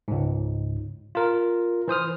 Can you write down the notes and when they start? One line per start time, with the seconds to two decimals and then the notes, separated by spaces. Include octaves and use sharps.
0.08 C#2 G#2
1.15 F4 A#4
1.88 E3 C5 D#6 F6